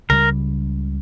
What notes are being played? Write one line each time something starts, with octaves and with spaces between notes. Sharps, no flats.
C#2 C#3 E3 G3 A#4